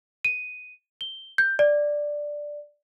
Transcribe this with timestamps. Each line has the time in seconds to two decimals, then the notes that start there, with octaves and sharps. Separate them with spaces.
0.25 D#7
1.01 G7
1.38 G6
1.59 D5